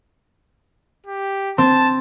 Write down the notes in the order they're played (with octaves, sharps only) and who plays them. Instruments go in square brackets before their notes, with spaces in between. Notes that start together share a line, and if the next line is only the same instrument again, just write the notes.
[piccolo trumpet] G4
[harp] C4 [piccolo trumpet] A5